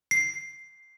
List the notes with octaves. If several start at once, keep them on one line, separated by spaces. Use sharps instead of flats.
C7